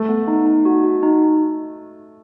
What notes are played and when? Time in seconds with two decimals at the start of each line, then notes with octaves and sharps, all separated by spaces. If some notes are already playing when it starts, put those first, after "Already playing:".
Already playing: A3
0.09 B3
0.27 D#4
0.46 D#4
0.65 F#4
0.84 F#4
1.03 D#4